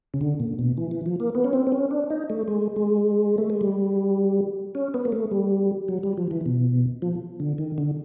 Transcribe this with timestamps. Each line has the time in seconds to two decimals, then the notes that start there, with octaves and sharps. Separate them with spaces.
0.14 C#3
0.21 D3
0.40 A#2
0.59 B2
0.77 E3
0.91 E3
1.06 F3
1.20 A#3
1.35 B3
1.44 C#4
1.53 C4
1.67 C4
1.72 C#4
1.91 D4
2.10 D#4
2.30 A3
2.48 G#3
2.76 G#3
3.38 A3
3.50 G#3
3.61 G3
4.75 C#4
4.94 B3
5.05 A#3
5.12 A3
5.31 G3
5.88 F#3
6.03 G3
6.17 F3
6.31 E3
6.46 B2
7.02 F3
7.40 D3
7.58 D#3
7.78 D3